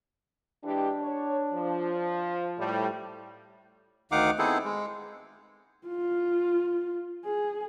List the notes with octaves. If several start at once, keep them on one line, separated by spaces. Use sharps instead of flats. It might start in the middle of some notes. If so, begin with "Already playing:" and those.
E3 G#3 D4 G4
C#5
F3
A2 G3
D2 D#3 D#4 F5 F#5 D6
B3 C4 D#4 E4 G#4 A4
G#3
F4
G#4